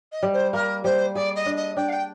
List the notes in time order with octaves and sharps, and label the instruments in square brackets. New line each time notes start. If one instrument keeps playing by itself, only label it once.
[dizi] D#5
[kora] G3
[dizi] C5
[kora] A#3 [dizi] A#4
[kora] G3 [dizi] C5
[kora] G#4 [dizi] D5
[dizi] D#5
[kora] D4
[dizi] D#5
[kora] D4 [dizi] G5
[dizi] F5
G5